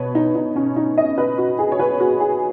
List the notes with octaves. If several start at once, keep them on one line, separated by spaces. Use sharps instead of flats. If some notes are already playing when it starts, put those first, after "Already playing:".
Already playing: B2 B4 C#5
D#4
D#4
C#4
D#4
D#5
B4
F#4
G#4
C#5
B4
F#4
G#4